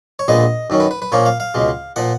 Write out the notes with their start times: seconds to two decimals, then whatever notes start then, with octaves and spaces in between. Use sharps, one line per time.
0.19 C#5
0.28 A#1 A#2 G#3 B3 D#5
0.70 F#2 D#3 F#3 C#4
0.80 B4
0.91 B4
1.02 B4
1.12 A#2 F3 A#3 C#4 C#5
1.26 F5
1.40 F5
1.54 C#2 B2 G#3
1.96 A#2 F3 F#5